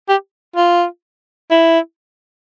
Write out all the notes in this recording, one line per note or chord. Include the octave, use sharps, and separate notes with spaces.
G4
F4
E4